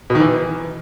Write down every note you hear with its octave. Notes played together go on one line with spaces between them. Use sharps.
B2
D#3
E3